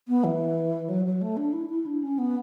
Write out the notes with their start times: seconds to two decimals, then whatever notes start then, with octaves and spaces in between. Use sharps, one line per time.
0.08 B3
0.24 E3
0.89 F#3
1.05 F#3
1.21 A3
1.37 D4
1.53 E4
1.69 E4
1.86 D4
2.03 C#4
2.18 B3